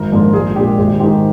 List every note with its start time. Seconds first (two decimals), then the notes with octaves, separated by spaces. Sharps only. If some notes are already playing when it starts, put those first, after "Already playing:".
Already playing: G#1 A#4
0.12 G#2 F3 A#3 D4
0.33 A#1 G#4
0.56 A#2 G#3 D4 G4
0.78 G#1 G#4
0.99 G#2 D#3 G4